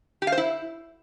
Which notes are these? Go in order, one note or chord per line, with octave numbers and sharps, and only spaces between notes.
G4
F5
C5
E4